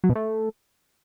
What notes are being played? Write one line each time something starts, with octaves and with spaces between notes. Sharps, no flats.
F#3
B2
A3